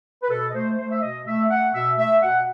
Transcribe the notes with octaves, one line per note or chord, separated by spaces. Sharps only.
B4
B2 A4
D#5
A3 C5
A3 C5
E5
B2 D#5
A3 E5
A3 F#5
B2 E5
A3 E5
B2 F#5